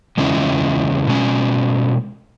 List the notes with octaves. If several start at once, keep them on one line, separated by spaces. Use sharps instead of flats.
E2 C#3 G#3 C#4 E4
B2 G#3 C#4